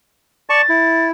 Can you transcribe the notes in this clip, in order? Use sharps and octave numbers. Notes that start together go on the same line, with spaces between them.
D5 A5 C#6 A6
E4